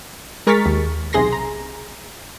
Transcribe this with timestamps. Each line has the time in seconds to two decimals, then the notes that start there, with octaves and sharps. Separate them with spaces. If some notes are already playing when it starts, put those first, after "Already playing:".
0.47 G#3 A#4 C#6 F6 A6 B6
0.66 D#2
1.13 B1 C3 G#4 C6 A#6
1.33 A#5